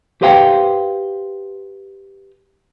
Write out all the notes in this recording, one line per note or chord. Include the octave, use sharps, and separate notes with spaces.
G4 B4 C5 F5 G5